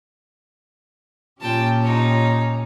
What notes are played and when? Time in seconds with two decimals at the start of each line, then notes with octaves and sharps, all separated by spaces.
1.40 A#2 C#4 G4 G5 A5
1.82 D#4 C#5